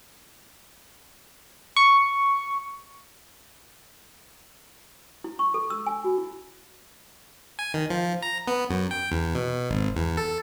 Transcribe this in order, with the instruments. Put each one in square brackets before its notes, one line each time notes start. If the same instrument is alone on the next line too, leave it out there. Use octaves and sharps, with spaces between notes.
[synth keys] C#6
[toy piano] E4
C#6
A4
E6
G#5
F#4
E4
[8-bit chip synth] G#5
D#3
F3
A#5
B3
F#2
G5
E2
B2
G#1
E2
A4